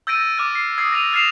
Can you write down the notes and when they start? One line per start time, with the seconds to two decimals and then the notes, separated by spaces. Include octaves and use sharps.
0.07 E6 G6 A6 A#6 D7 D#7
0.37 D6 F6 A6
0.55 C7
0.78 D#6 G#6 C7
0.92 A#6 D#7 F7
1.13 F6 A6 A#6 C7 E7 F7